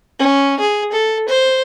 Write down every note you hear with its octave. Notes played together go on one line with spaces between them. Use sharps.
C#4
G#4
A4
C5